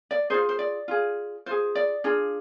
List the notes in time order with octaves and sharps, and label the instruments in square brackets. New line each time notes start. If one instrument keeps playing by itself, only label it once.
[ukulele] D5
F4 G#4 C5
C5
D5
F4 G#4
F4 G#4 C5
D5
D4 F4 G#4